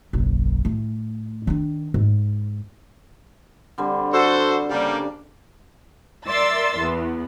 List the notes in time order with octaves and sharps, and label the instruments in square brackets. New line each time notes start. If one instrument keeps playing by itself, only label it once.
[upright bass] F#1 B1
A2
D#3 D4
G#2
[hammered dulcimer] D3 G3 C4
[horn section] F#4 A4 C5
[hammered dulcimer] C#3 D4 [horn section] G3 A#3
[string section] A#4 D5 E5 C6 E6 A6
E2 B3